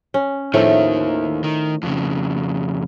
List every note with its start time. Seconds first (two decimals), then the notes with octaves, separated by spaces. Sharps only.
0.14 C#4
0.54 D#2 A2 D#3 F3 A3
1.44 D#3
1.83 F2 C#3